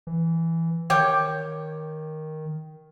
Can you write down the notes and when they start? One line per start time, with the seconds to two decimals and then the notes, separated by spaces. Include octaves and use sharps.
0.07 E3
0.90 D#3 G4 C#5